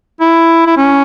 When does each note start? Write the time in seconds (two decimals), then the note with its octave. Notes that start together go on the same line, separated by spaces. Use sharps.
0.20 E4
0.66 E4
0.77 C#4